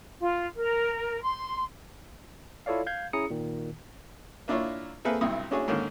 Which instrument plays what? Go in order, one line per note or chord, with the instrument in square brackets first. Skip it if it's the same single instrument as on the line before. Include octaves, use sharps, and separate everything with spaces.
[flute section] F4
A#4
C6
[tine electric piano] E4 F4 A4 C#5 D5 F5
F5 G6 G#6
C#4 E4 G#4 A#5 D#6 C#7
A#2 D#3
[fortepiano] A#3 D4 E4 F4 C#5
A#3 C4 G#4 A4 B4 E5
B1 G2 C3 E4 D#6
C#4 D4 E4 F#4 G#4 C#5
G#2 D3 D#3 A#3 C#4